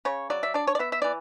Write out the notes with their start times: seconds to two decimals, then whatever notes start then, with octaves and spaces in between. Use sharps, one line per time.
0.05 C#3 C#5
0.30 F#3 D5
0.43 E5
0.54 D4 D5
0.67 C#5
0.75 D5
0.79 B3 E5
0.92 E5
1.02 E3 D5